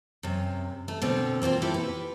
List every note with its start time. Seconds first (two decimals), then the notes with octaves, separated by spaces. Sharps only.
0.23 F#2 C3
0.88 A3
1.02 B2 D3 C4
1.42 A#3 C4 F4 C5
1.62 A#3 E4 G4 A4
1.74 B4